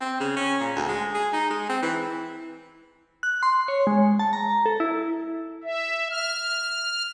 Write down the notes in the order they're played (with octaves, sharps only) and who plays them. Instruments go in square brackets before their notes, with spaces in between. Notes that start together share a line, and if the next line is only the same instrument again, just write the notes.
[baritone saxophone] C4
C#3
C#4
A#2
D2
G#3
G#4
D#4
G#3
C4
E3
[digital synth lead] F#6
C6
C#5
G#3
A5
A#5
A4
E4
[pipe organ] E5
F6